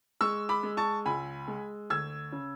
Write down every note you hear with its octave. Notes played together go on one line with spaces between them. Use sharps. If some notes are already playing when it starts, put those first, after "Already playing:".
G#3 C#6 E6
B5 D6
G#3
A5 C#6
C#2 G#5 B5
G#3
D2 E6 G#6
C#3